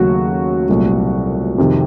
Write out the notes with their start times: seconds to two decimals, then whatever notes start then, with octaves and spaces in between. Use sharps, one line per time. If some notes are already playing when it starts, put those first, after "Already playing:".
Already playing: D#2 C#3 F#3 A3 F#4
0.68 C2 A#2 F#3 A3
1.58 F2 C3 D#3